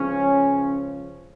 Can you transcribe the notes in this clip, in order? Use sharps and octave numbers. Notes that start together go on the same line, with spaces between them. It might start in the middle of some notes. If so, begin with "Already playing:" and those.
Already playing: C#2 C#3 F3 C#4